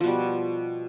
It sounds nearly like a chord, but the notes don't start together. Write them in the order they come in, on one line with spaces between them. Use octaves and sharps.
F3 B2 G3